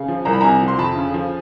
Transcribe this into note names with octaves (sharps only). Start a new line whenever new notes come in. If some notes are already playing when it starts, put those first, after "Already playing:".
Already playing: C#3
F3
C2 A#5
B5
C3 G#5 A#5
F3
C6
F2 A5 B5
C#3
F3